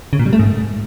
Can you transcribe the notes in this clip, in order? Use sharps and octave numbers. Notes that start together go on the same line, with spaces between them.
C#3
A#2
G3
A3
G#2